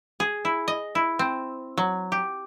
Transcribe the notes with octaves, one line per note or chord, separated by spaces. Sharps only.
G#4
E4
D#5
E4
C4
F#3
G4